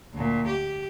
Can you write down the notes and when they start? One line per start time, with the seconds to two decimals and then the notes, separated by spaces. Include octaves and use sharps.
0.14 D2 A#2
0.48 G4